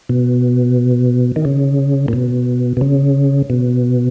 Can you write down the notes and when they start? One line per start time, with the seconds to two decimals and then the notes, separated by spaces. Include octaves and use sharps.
0.09 B2
1.36 D#3
1.45 C#3
2.08 A#2
2.13 B2
2.77 B2
2.81 C#3
3.50 B2